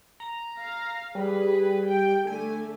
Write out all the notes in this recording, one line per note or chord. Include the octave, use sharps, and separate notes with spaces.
A#5
F5
G3 G#4 B4
G5
D3 A3 G#5